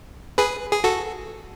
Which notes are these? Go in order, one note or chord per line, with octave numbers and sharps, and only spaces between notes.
G#4 B4
G#4
F#4 A4